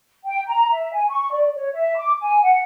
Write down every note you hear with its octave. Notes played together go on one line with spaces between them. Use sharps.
G5
A#5
E5
G#5
C#6
D5
C#5
E5
D6
G#5
F#5